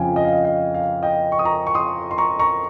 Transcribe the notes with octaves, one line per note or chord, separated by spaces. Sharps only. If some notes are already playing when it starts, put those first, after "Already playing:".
Already playing: F2 C#3 F3 F5 G5 G#5
D#5
F5
D#5
F5
F5
D#5 G5
C#6
D#6
A#5 C#6
C#6
C6 D#6
C6
A#5 C#6
A#5 C#6